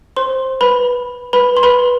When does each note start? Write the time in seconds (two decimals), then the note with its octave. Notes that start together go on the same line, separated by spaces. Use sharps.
0.16 C5 C6
0.61 B4 B5
1.33 B4 B5
1.57 C6
1.63 B4 B5